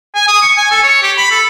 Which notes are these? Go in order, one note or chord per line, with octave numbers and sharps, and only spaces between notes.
G#5
D#6
C#6
G#5
A4
C#5
G4
B5
A4